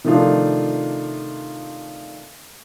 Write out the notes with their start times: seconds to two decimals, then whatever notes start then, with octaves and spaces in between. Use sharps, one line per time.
0.04 C3 D#3 F3 A3 D4 F4